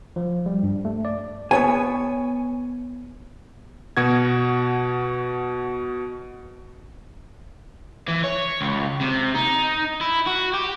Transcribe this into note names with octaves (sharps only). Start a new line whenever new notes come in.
F3
G3
G2
A3
D5
B3 C#5 G#5
B2 F#4 G#6
E3
C#5
C#2
C3
D#4
E4
F#4
G4